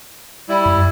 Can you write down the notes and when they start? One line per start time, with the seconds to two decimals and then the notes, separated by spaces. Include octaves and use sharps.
0.49 G3 E4
0.66 F#2